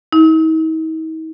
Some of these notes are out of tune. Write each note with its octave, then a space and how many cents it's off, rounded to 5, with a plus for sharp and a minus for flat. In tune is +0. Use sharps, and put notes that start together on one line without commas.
D#4 +45